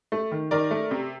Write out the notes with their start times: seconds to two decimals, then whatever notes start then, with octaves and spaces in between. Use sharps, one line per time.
0.12 A3
0.32 D#3
0.51 D#3 A#4 D5
0.71 A3
0.91 C3